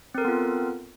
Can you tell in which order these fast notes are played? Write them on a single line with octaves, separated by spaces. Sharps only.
C4 A#4 A4 B3 F4